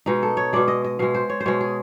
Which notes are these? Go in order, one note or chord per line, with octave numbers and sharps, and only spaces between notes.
B2 G#3 D#4
A4
C#5
B2 G#3 D5
D#5
D#5
B2 G#3 F5
C5
C#5
C5
B2 G#3 C#5
G#4